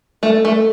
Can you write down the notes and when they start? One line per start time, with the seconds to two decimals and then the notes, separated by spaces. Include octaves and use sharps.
0.23 A3 A4
0.45 A3